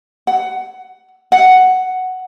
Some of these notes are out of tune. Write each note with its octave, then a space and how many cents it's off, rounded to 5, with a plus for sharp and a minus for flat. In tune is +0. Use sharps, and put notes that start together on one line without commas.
F#5 +20
F#5 +5